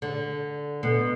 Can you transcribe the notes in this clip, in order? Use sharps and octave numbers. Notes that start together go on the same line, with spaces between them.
D3
B2